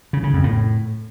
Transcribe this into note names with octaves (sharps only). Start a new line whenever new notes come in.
C#3
C#3
F2
A2